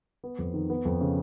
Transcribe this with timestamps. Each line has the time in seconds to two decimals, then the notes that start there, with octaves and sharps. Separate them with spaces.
0.24 B3
0.39 F2
0.53 D#3
0.70 B3
0.85 F2
1.01 C#3